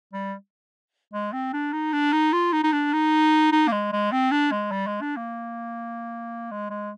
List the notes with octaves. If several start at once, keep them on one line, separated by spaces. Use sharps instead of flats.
G3
G#3
C4
D4
D#4
D4
D#4
F4
D#4
D#4
D4
D#4
D#4
A#3
G#3
G#3
C4
D4
G#3
G3
G#3
D4
A#3
G#3
G#3